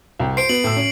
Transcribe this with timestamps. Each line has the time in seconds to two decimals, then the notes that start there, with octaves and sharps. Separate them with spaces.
0.20 C2 G5
0.37 C5 C7 D7
0.49 B3 F#7
0.64 A2 E6
0.76 C#4